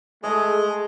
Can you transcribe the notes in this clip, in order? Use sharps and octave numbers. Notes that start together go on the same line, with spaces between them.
G#3 A3 G#4 D#5